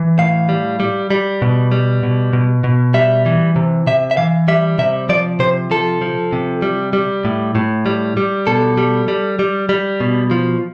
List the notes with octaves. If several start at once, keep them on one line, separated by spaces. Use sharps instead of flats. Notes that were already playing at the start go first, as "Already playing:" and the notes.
Already playing: E3
A2 F5
G3
G3
G3
B2
G3
B2
B2
B2
G3 E5
E3
C3
C3 E5
E5
E3 F5
G3 E5
C3 E5
F3 D5
C3 C5
F3 A4
F3
C3
G3
G3
A2
A2
G3
G3
B2 A4
G3
G3
G3
G3
B2
F3